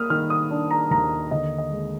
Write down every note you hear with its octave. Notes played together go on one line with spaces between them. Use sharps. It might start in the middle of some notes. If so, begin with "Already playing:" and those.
Already playing: A#3 D#6 F6
D#3 F6
D#6
D4
A#5
D#2 A#5
D3 D#5
D#5
G#3